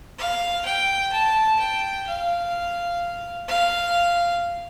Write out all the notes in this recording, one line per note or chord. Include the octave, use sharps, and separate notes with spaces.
F5
G5
A5
G5
F5
F5